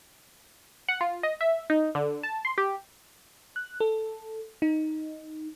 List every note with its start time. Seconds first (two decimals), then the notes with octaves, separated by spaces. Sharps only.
0.88 F#5
1.01 F4
1.23 D#5
1.41 E5
1.70 D#4
1.95 D3
2.23 A5
2.45 C6
2.58 G4
3.56 F#6
3.80 A4
4.62 D#4